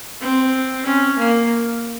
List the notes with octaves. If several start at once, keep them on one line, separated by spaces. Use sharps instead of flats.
C4
C#4
A#3